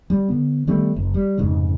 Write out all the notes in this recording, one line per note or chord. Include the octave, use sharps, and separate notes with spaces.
G3
D3 B3
D#3 G3 A3 B3
F#1
G3
F1 G#2 C#3 G#3